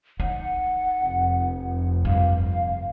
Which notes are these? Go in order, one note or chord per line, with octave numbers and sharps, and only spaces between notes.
D#4 F#5
F1
G2 F5